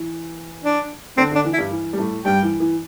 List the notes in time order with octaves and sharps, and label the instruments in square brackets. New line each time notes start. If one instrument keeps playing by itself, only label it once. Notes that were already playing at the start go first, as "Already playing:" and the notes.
Already playing: [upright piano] E3
[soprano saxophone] D4
[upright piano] D3 D4 [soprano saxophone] C4
[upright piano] D3 [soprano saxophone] D4
[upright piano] E3
[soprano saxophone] E4
[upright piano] G2 G3
E3
G3
A2 A3
[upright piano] G2 G3 [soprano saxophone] G5
[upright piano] E3
E3